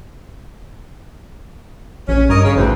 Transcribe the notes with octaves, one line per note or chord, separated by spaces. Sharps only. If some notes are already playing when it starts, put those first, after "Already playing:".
A#1 C#4
G2 A#4 C#5 D#5
C#3
A1 D2 E3 C4